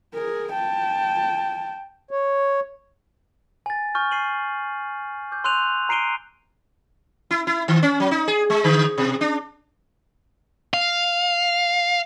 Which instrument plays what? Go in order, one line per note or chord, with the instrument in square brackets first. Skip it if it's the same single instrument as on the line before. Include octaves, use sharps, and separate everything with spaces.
[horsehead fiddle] G#4 A#4
G5 A5
[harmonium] C#5
[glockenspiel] G#5 A6
G#5 C#6 F6 G6
C7 D#7 F#7
D6 G6
C6 E6 F#6 D#7 F7 F#7
A#5 C7 D7 D#7 G7
[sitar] E4
E4
D#3
C#4
F#3
D#4
G#4
G#3
D3
B2
D4
[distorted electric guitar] F5